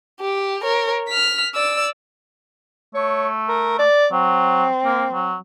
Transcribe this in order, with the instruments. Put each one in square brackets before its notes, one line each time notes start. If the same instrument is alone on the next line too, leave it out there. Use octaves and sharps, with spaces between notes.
[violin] G4
A#4 C#5
F6 B6
D5 E6
[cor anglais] A3 [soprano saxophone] C#5
[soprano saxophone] A#4
D5
[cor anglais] F#3 [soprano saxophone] C4
[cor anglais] A#3
F#3